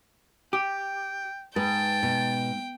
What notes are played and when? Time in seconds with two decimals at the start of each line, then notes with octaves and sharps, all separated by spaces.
0.53 G4 G5
1.56 G#2 B4 G5 A5
2.03 B2